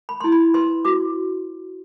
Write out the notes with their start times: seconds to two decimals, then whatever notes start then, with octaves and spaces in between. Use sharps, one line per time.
0.09 B5
0.20 E4 C6
0.32 B5
0.54 B4 C6
0.85 F#4 D6